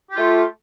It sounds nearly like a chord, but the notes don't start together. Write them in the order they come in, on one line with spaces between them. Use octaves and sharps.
G4 F4 A3